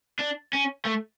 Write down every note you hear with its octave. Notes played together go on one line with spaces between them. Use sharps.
D4
C#4
A3